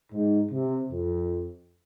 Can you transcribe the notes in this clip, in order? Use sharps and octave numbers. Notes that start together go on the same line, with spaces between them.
G#2
C3
F2